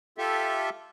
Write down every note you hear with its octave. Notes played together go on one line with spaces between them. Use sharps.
F4 G4 A4 E5